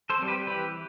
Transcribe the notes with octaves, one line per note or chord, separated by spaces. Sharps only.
A4 C5
G3 C4
G4 B4
E3 G4 B4